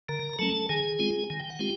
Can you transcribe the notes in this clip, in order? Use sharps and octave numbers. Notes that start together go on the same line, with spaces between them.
D3 A#4 A#5
A#5
F#3 A3 C#4 A4 A5
D#3 G#4 G#5
G#3 C4 F4
D#3 G#5
G5
F#5
G#3 C4 F4 G4 G5